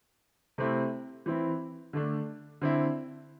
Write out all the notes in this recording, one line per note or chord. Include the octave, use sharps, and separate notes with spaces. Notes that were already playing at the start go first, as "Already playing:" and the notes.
C3 A3 C4 E4
E3 C4 E4
D3 A3 D4
D3 C4 E4